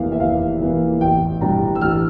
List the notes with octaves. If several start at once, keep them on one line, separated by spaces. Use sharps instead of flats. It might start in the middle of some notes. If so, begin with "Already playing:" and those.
Already playing: F1 E2 E3 A#3 F5
E5
F1 F5
E2 E3 A#3
A1 G5
A2 G3 D4 A#5
E6
A1 F6